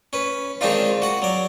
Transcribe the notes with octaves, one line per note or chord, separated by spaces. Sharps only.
C#4 B4
D#3 G#3 C4 D4 D#4 F4
F#4 F#5
F#3 D5